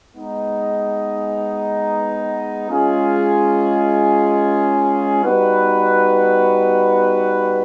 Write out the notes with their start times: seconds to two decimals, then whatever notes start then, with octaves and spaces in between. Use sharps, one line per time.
0.14 G#3 B3 D#4
2.69 G#3 C#4 F4 G#4
5.23 G3 B3 D#4 F#4 B4